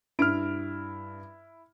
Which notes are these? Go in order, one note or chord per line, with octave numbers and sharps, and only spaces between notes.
G2 E4 F6 D7